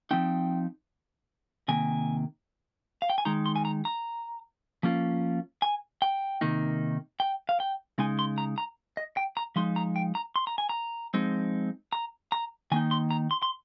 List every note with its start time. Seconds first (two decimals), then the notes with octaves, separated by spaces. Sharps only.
0.11 F3 C4 D#4 G5
1.68 C3 D#3 A#3 G#5
3.02 F5
3.10 G5
3.18 G#5
3.25 D#3 G#3 D#4 A#5
3.46 C6
3.56 G#5
3.65 A#5
3.85 A#5
4.83 F3 A#3 C#4 F4
5.62 G#5
6.02 G5
6.41 C3 D#3 A#3 D#4
7.20 G5
7.49 F5
7.60 G5
7.98 C#3 G#3 D#4 G#5
8.19 C6
8.38 A#5
8.58 A#5
8.97 D#5
9.17 G5
9.37 A#5
9.56 F3 G#3 D#4 C6
9.76 A#5
9.96 G5
10.15 A#5
10.36 C6
10.47 A#5
10.58 G#5
10.69 A#5
11.14 F3 G#3 C4 D#4
11.93 A#5
12.32 A#5
12.72 D#3 A#3 D#4 G#5
12.91 C6
13.11 A#5
13.31 C6
13.42 C6